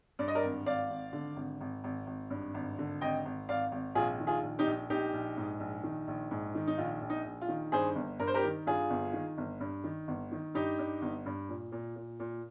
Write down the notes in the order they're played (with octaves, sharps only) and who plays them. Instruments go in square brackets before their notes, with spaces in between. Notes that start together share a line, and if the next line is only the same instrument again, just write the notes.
[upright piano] G2 D5
D#5
A#4 D5
G#1
G#1 D5 F5
G#1
D3
G#1
G#1
G#1
G#1
G2
G#1
D3
G#1 D#5 G5
G#1
G#1 D5 F5
G#1
A#1 F4 G#4
D#3
F4 G#4
A#1
D#4 G4
A#1
A#1 D#4 G4
A#1
G#2
A#1
D#3
A#1
G#2
D#3
D#4
A#1 F4
A#1
D#4
A#1
F4
D#3
G2 G#4 C5
G1
G2 A#4
C5
G4 A#4
D#3
G2 F4 G#4
G1
D#3
G1
G2
D#3
G1
D#3
G2 D#4 G4
G2
G1
G2
A#2
A#2
A#2
A#2